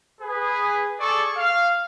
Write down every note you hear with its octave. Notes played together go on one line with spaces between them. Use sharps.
G#4 B4
G#4 A4 D5 C#6
F5